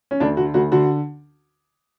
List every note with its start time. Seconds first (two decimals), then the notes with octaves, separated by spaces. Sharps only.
0.11 C#4
0.20 D2 D4
0.37 D3 F#4
0.54 D2 F#4
0.72 D3 F#4